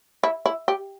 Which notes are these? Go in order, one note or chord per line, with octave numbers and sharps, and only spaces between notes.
E4
E4
G4